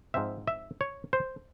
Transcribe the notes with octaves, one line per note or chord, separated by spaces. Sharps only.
G#2 F3 C4 E5
E5
C#5
C5